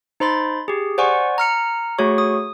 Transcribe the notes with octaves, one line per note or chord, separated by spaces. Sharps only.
D#4 C5 B5 C6 A6
G4 G#4
C5 D5 F#5 G#5 C#6
A#5 F6 C#7
A3 F#4 G#4 C#5 C#6
D#6